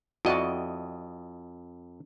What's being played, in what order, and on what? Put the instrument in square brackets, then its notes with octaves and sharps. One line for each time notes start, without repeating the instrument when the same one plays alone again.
[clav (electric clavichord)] F2 D#5 [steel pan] E4 F#4 D5